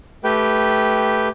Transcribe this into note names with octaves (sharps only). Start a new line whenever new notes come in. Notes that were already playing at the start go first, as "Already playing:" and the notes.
A3 G4 B4 G5